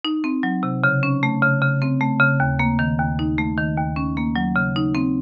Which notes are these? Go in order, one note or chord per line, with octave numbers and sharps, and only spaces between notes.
D#4
C4
F#3
C3
C#3
C#4
A3
C#3
C#3
C4
A3
C#3
D#2
A#3
D#3
D#2
D#4
A3
D#3
D#2
C#4
A#3
F#3
C#3
D#4
C4